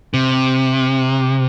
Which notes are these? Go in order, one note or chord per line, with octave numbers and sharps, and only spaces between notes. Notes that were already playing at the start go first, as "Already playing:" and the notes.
C3